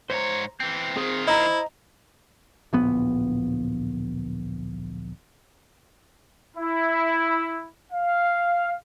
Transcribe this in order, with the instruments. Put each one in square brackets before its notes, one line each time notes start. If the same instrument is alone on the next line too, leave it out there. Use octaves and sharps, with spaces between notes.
[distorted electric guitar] G#2 C#5 [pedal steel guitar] C5 A#5
[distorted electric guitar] E3 C4 [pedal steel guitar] G6
[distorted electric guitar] D#3 F4 [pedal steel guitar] C4 G#4 C5
[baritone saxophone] E4 [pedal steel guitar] C5 [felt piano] D#5 A#5
[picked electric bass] D1 A#1 B3
[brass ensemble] E4
F5